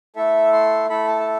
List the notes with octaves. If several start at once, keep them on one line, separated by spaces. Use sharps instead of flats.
A3 E4 A4 E5
C6
A3 E4 A4 B5
A5
A5